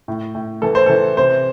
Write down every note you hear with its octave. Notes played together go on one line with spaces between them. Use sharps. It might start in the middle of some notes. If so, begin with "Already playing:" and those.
A2
A2
E3 A4
C5
E3 A4
C3 C5